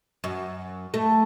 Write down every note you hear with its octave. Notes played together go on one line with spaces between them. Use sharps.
F#2
A3